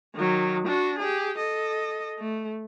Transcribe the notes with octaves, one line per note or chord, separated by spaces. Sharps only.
D#3 F#3
D4 F#4
G4 G#4
A4 D#5
A3